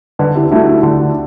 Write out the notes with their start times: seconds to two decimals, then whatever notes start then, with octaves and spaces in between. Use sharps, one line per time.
0.19 D3 B4 D5
0.35 E4 G4
0.51 A3 D4 E4 F#4
0.67 D4 F#4
0.83 D3